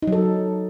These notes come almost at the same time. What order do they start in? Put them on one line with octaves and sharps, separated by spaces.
D#4 F#3 A4